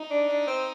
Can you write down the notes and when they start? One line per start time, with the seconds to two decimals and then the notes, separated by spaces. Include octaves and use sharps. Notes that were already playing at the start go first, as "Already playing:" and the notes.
Already playing: D#4
0.10 D4
0.29 D4
0.47 C4